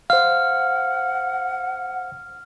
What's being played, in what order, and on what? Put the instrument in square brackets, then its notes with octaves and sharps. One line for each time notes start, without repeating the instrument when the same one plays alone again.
[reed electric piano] C5 F5 [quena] F#5 [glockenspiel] F6